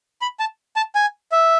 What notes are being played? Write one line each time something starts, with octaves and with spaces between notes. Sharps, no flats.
B5
A5
A5
G#5
E5